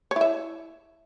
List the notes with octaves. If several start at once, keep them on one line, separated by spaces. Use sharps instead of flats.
E4 C#5 E5